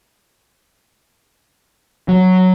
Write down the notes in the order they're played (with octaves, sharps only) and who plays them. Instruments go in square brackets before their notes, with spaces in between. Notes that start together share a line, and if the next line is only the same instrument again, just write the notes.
[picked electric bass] F#3